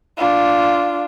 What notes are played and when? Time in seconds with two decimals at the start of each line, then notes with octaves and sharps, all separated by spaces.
0.18 D4 F4